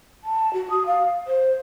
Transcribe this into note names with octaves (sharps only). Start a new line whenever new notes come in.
A5
F#4
D#6
F5
C5